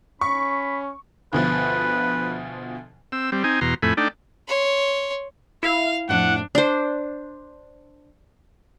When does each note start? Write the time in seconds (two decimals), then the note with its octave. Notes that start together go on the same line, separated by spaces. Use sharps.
0.21 C#4 B5 C#6
1.33 D2 B2 F3 B4
3.12 C4 E6
3.32 G3 C4
3.44 C4 D#4 G#5
3.61 E2 B2 A#5 C6
3.83 F2 A2 A3 G#5 B5
3.97 A3 D4 D#4 D5 G5
4.47 C#5 C6
5.63 E4 F5
6.09 F2 A2 D4 F#5
6.55 D4 C5